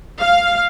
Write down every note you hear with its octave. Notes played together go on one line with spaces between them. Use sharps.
F5